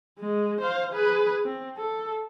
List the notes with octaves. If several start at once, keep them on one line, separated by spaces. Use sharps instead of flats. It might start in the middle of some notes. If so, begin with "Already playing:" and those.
G#3
C5 F5
G#4 B4
C4
A4